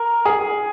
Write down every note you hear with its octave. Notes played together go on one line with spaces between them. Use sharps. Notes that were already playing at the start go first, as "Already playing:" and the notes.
Already playing: A#4
G#4